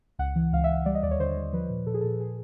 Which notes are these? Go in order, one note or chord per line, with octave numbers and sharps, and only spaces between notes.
C#2 F#5
E3
C#2 F5
E5
C#2
G3 D5
D#5
D#2 D5
C#5
D3 C5
G3
F3 B4
A#2
A#2 A4
G#4
A4
A#2
G#4